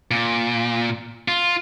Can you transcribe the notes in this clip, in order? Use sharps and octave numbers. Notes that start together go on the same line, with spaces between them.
A#2
F4